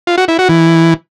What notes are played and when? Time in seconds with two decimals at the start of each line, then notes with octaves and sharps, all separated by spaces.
0.07 F4
0.18 F#4
0.28 E4
0.39 F#4
0.49 E3